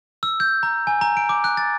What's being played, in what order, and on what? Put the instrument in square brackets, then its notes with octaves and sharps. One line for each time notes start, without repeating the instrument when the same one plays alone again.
[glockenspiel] E6
G6
A#5
G#5
A#5
D7
D6
F#6
A6